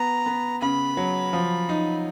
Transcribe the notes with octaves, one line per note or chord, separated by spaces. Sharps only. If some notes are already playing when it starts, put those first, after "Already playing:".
Already playing: B3 A#5
B3
C#3 B5
F#3
F3
D#4